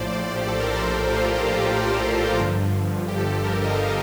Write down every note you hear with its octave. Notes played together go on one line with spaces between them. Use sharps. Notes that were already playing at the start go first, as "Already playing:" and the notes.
Already playing: A#1 A2 F3 C5 D5
G4
A4
A#4
C5
D5
F4
G4
G1 G2 D3 F3
G4
A4
A#4
D#5
F5